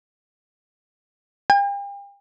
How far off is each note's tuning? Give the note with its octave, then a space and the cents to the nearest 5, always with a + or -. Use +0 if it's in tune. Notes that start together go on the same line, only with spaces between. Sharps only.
G5 +40